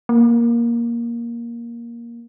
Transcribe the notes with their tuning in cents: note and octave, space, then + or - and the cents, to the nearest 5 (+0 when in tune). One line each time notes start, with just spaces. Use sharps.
A#3 +10